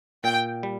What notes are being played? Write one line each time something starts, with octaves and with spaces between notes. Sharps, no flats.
A#2 G5
G3